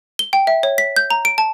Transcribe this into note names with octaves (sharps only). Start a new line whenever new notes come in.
G7
G5
E5
C#5
B6
G6
A#5
D7
A5